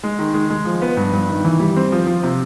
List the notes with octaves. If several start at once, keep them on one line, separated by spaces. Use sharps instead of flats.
G#3
D#3
G#3
G#3
F3
B3
G2
G2
D#3
E3
G3
C4
F3
F3
C3